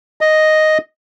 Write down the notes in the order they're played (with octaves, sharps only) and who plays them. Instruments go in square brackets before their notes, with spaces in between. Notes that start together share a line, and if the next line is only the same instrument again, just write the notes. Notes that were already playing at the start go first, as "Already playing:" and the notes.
[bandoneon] D#5